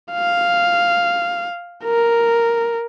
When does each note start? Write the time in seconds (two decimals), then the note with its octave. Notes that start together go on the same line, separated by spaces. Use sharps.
0.12 F5
1.84 A#4